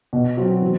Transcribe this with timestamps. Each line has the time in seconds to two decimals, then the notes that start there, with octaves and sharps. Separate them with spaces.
0.13 B2
0.37 F#3 C4 F#4
0.62 E3